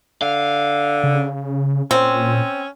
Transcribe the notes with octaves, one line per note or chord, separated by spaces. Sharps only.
D3 F5
C#3
A#2 C4 C#4